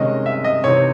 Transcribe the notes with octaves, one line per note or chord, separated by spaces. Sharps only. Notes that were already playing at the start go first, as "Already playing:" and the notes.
Already playing: C3 D#3 G#3 C#4 D#5
E5
D#5
C3 E3 C4 D#4 C#5